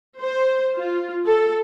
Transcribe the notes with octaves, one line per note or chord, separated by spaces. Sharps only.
C5
F4
A4